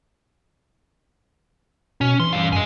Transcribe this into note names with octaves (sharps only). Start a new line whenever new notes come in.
B2 C#4
E3 C6
G2 F5
F#2 D#5 G#5